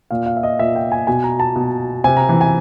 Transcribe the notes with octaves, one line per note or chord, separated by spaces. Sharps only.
A#2 F5
F5
E5
D#5
A#2 E5
G5
G#5
B2 G#5
A#5
A5
B2
C3 G#5
A#5
E3
G#5